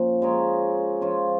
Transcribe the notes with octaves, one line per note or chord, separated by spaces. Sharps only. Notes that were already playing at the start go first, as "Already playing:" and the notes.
Already playing: A#2 F3 C#4
G#3 F4 A#4 C#5
F3 C#4 F4 C#5